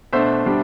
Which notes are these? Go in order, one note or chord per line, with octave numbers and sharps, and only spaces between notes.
B2 A3 D4 C5 E5
B2 G3 D4